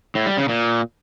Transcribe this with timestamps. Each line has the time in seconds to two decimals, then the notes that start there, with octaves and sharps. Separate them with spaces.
0.15 A2
0.26 G3
0.38 C#3
0.49 A#2